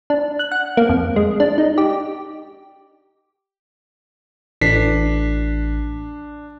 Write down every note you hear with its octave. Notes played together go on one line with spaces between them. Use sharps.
D4
F#6
F#5
A#3
F2
G#3
D4
D#4
G4
A1 D4 B6 C7